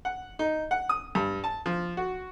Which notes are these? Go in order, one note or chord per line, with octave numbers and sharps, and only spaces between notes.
F#5
D#4
F#5
D#6
G2
A5
F3
F#4